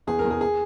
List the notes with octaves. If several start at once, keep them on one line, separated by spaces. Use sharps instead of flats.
E2 G#4
A#4
E2
G#4
G#4